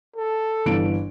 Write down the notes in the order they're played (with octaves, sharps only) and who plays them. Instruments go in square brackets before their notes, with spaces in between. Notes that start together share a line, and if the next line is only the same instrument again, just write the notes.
[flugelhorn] A4
[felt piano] G1 E3 D7